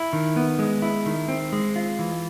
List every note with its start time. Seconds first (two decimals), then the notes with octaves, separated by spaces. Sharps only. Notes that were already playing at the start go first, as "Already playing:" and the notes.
Already playing: E4
0.13 D#3
0.36 B3
0.59 G#3
0.82 E4
1.06 D#3
1.28 C4
1.53 G#3
1.76 F4
1.99 E3